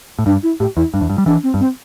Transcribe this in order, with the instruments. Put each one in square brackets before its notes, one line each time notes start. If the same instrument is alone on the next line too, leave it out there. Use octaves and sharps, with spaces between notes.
[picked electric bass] A2
[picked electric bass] G2 [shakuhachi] D4
[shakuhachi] E4
[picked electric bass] A2 [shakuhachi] G4
[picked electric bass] E2 [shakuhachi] E4
[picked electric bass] G2 [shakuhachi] D4
[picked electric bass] E2
G2
G3
[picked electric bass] E3 [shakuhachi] D4
[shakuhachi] C4
[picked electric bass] G2
[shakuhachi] C4